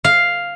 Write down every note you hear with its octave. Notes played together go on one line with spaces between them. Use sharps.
F5